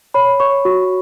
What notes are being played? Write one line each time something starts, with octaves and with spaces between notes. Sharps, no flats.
C#5 B5
C#5 C#6
F#4 C#6